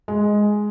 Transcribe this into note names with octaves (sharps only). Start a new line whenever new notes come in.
G#3